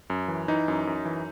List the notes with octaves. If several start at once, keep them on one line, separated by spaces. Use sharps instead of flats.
F#2
E3
E3 D#4
F#2
F#2
E3